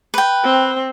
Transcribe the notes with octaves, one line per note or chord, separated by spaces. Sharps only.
B4 G5
C4